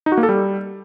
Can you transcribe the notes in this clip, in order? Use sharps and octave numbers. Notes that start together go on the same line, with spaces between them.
D#4
F#4
A#3
A4
G3